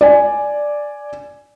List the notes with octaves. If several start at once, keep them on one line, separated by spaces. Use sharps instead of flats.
D5 G#5